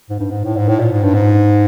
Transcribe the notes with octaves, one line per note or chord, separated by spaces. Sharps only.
G#2
G2
G#2
A2
G#2
A2
A#2
G#2
G2
G#2